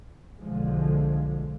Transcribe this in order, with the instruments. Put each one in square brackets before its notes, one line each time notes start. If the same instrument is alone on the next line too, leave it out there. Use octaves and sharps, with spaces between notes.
[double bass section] B1 D3 F3 G#3